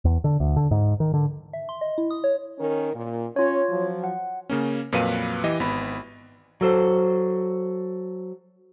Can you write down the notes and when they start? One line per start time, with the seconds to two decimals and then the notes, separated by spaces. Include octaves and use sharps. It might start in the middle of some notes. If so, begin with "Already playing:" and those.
0.05 E2
0.24 D3
0.40 D2
0.56 D3
0.71 G#2
1.00 D#3
1.14 D3
1.53 E5
1.69 C6
1.81 D#5
1.98 E4
2.11 D#6
2.24 C#5
2.59 D#3 C#4 A#4
2.94 A#2
3.36 C#4 F4 C#5
3.70 F3 F#3
4.04 F#5
4.50 C#3 A#3 C#4
4.92 F2 A#2 F#3 B4 F5 D#7
5.44 E3 G4 D#5
5.60 G#1 B3 B5
6.61 F#3 A4 C5